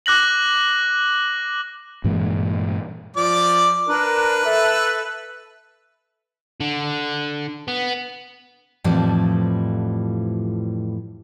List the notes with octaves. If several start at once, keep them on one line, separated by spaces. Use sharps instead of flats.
D6 F#6 A#6 F#7
G2 A#2 E3 G#3
F3 D5 D6
D4 A#4 B4
A4 E5
D3
B3
F2 A2 E3 F3 G3